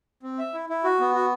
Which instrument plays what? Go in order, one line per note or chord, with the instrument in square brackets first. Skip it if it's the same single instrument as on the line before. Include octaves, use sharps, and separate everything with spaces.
[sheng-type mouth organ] C4
E5
E4
E4
F#4
B3
F#4